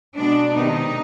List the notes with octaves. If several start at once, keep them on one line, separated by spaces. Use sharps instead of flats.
B2 G#3 B3 D4
C3 D#3 B3 D#4